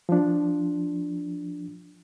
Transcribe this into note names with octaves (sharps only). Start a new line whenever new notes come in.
F3 D4